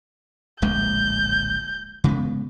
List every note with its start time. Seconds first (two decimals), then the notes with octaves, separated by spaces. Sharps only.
0.62 D1 A#1 G#3 G6
2.04 C#3 G#3 B3